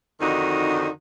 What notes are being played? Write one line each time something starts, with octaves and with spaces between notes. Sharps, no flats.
F2 D3 D#3 D#4 F#4